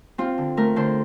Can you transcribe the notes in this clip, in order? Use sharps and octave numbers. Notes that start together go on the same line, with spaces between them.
C4 F4
D3
A3 A#4
D3 C5